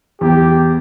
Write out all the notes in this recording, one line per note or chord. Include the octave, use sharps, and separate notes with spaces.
E2 G4